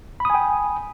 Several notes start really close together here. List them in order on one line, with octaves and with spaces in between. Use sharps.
B5 D#6 G#5 G5